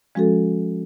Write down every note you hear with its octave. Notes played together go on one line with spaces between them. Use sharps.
F3 G#3 C#4 F#4 A4